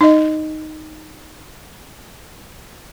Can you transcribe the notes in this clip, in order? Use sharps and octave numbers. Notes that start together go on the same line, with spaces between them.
D#4 D#5